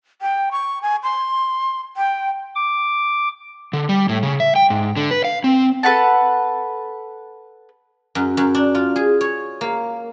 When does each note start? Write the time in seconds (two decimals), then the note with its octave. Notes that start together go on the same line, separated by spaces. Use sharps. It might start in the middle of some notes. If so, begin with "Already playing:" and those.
0.22 G5
0.52 C#6
0.82 G#5
1.03 C6
1.97 G5
2.55 D6
3.73 D3
3.89 G3
4.09 A2
4.23 C#3
4.40 E5
4.56 G5
4.70 G#2
4.96 D3
5.11 B4
5.24 F5
5.44 C4
5.83 A4 B4 F#5 A5
8.15 F#2
8.37 F#2
8.55 D4
8.75 F4
8.96 G#4
9.21 C#5
9.61 A#3